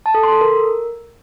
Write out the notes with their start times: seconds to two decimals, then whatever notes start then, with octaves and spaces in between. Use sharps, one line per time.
0.06 A5
0.15 A4
0.23 C6
0.32 A4
0.41 A#4